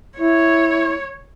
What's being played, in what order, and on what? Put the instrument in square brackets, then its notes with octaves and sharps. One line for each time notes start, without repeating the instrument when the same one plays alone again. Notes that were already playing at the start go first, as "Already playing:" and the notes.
[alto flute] E4 [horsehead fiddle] C#5